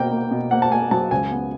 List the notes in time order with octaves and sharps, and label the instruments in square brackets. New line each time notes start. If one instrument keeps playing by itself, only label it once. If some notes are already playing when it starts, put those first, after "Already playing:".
Already playing: [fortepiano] B2 A#3 G5
A#3
B2
A#3 F#5
A5
A#3 G#5
F#3 A5
C#2 G#5
B3